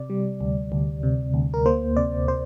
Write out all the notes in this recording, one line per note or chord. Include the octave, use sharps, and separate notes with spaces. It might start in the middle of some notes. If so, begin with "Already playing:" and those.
Already playing: C3 D5
G3
D2
D2
C3
D2
A#4
A#3 C5
C3 D5
C3 C5